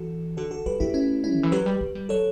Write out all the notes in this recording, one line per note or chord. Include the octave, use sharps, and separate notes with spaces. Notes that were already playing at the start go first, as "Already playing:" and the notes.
Already playing: E3 F#4 A4
D3 F#4 A4
F#4 A4
G3 G4 B4
A3 E4 G4
C#4 E4
C#4 E4
D3
E3
F#3 G4 B4
G3
A3
G3
F#3 A4 C#5